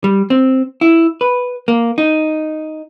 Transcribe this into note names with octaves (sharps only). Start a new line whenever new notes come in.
G3
C4
E4
B4
A#3
D#4